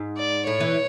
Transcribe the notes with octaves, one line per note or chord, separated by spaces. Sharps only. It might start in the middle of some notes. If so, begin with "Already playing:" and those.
Already playing: G#2
D5
A2 C#5
E3